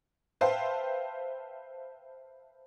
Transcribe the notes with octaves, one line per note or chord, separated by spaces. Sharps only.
B4 C5 E5 F5 G5 A5